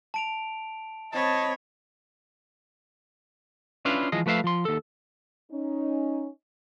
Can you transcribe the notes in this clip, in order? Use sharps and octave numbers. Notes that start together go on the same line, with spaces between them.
A5 D7 F7
C4 C#5 D#5 A5 B5
C#4 D4 E4 F4 B4 F5
E3 F3 G#3 G#4 D#5
F3 A3 B4 E5 F5
F3 C6
D#2 A4
C#4 D#4